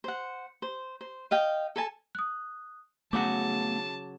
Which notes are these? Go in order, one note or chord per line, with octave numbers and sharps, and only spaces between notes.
C5 F#5
C5
C5
D#5 F5 G5
A4 G#5 A5
D#6 F#6
C#3 F#3 A3 B3 F#4 A5 D6